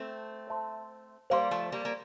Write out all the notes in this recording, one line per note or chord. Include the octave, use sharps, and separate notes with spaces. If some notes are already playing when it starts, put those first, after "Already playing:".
Already playing: A3 C4
C5 E5 A5 C6
G3 A#3 C5 F5 C6
F3 A3
G3 A#3
A#3